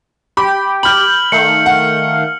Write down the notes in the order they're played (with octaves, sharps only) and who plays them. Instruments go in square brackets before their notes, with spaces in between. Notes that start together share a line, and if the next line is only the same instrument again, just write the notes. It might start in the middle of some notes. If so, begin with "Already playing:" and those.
[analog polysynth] G4 G5 [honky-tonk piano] B5
[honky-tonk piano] B5 G6 [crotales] F6 F#7
[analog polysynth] D#3 A3 F5 [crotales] C#7
[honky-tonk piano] F#5